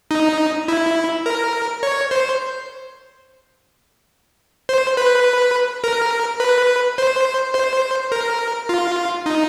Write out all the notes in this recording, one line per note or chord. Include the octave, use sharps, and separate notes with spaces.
D#4
E4
A#4
C#5
C5
C5
B4
A#4
B4
C5
C5
A#4
F4
D#4